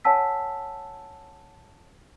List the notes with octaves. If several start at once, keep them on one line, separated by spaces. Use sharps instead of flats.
C#5 F#5 G#5 A5 E6 B6